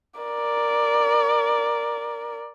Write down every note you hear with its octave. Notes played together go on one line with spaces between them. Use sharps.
A#4 D5